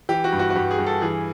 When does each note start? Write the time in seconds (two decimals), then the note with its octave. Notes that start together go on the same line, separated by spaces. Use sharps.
0.09 E3 G4
0.24 F#4
0.32 G2
0.39 F#4
0.50 F#4
0.55 G2 G4
0.71 G#4
0.78 G2
0.86 A4
1.02 E3 G#4